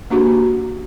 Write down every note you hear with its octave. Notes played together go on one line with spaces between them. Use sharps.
A#3 D4 F#4 G4